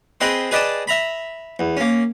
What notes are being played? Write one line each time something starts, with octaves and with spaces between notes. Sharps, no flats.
C4 G#4 B4 D#5 G5 C6
G#4 B4 D5 D#5 G5 A5
E5 A#5 B5
E2
A#3 C#4